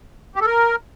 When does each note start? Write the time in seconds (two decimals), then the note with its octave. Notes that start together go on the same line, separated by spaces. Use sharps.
0.35 G4
0.41 A4
0.46 A#4